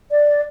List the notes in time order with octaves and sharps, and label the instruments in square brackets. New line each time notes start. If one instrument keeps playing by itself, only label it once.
[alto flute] D5